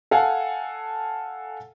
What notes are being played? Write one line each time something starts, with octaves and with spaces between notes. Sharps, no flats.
A4 F5 F#5 G#5